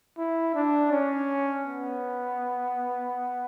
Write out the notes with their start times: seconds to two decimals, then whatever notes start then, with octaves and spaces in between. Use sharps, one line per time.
0.18 E4
0.55 D4
0.92 C#4
1.67 B3